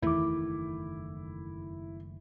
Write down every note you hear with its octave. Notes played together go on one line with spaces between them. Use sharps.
F#1 E2 D#3 A3 E4 D6